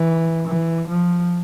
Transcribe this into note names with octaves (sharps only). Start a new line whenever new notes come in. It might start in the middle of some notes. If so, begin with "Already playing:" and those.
Already playing: E3
E3
F3